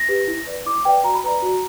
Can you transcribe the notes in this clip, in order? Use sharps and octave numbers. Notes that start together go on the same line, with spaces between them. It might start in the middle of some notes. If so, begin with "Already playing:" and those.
Already playing: A#6
G4 B4
E4
B4 D5
E4 D6
B4 D5 G5
F#4 A#5
B5
B4 D5 A#5
F#4